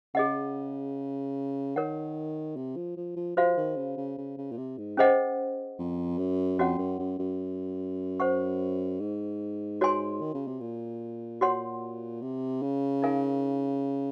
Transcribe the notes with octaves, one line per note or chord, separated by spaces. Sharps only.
C#3 G#4 D#5 F#5
D#3 A#4 C#5 F#5
C3
F3
F3
F3
F3 F#4 C5 F5
D#3
C#3
C#3
C#3
C#3
A#2
C3
G#2
C#4 G#4 C5 D#5 F#5
F2
F#2
F2 C#4 F#4 C#5 F#5
F#2
F#2
F#2
C5 F#5 C#6
G#2
F#4 C#5 G#5 C6
D#3
C#3
C3
A#2
F#4 C#5 F#5 C6
C3
C#3
D#4 A#4 F5 G#5